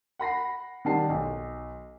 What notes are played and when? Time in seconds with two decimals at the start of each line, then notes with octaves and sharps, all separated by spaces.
0.19 F#5 B5 A#6 C7
0.85 D#3 G3 F#5 A5 C7
1.09 B1